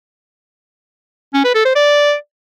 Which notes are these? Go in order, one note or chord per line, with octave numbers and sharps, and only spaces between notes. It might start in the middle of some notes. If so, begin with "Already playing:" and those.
C#4
B4
A4
C5
D5